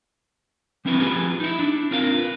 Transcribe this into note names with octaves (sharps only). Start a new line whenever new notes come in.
F3 C4 C#4 E4 B4
F3 G4 G#4 B4
D#4 E4
D4
C4 F4 A#4 F5
B4